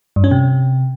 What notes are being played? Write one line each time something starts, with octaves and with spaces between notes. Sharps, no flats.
G2
C#4
C3